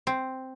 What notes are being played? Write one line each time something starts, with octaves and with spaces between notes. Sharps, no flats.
C4